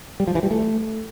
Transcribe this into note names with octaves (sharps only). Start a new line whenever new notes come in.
G3
F3
E3
G3
A3